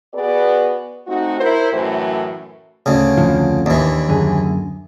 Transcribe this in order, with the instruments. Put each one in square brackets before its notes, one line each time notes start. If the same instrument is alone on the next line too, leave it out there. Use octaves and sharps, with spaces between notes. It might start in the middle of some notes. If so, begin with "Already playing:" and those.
[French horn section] B3 F#4 G#4 B4 D5
A3 C4 D#4 F#4
E4 A#4 C5
F#2 A2 E3 A3 E4 F#4
[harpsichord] D2 C#3
[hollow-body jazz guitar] F2 D3 F3
[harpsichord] D#2 E3 [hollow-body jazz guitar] D4
[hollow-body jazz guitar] F#2 D3 G#4